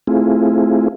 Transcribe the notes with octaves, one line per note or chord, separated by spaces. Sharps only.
A3 C4 E4 F4 G#4